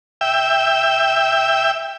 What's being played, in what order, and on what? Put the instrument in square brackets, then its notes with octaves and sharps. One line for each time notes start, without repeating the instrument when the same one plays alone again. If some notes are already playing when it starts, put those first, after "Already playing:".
[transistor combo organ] E5 G5